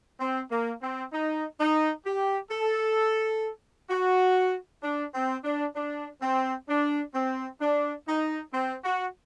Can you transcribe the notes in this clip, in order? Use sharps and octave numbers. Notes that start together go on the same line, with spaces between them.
C4
A#3
C4
D#4
D#4
G4
A4
F#4
D4
C4
D4
D4
C4
D4
C4
D4
D#4
C4
F#4